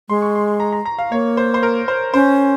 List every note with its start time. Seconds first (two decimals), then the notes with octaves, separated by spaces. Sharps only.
0.09 G#3 C6
0.22 C#6
0.35 C6
0.60 A#5
0.73 A#5
0.86 A#5
0.99 F5
1.11 A#3 C#5
1.37 C5
1.54 C5
1.63 A#4
1.88 C5
2.14 C#4 C5